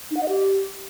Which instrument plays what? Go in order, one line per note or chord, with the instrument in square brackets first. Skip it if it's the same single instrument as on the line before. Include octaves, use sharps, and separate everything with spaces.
[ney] D#4
F#5
D#5
G4